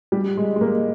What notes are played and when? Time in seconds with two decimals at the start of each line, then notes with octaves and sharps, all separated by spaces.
0.12 G3
0.37 G#3
0.56 G#3
0.61 A#3